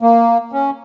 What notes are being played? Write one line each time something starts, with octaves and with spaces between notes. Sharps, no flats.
A#3
C#4